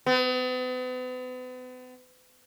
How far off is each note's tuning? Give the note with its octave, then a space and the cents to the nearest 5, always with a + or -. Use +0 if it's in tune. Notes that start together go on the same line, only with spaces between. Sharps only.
B3 +40